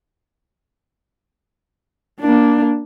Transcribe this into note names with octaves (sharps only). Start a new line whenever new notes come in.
A#3 D4